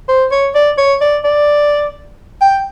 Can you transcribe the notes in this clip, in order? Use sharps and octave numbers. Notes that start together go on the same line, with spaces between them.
C5
C#5
D5
C#5
D5
D5
G5